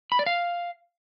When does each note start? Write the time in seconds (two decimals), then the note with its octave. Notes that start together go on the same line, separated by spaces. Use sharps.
0.12 B5
0.19 D5
0.26 F5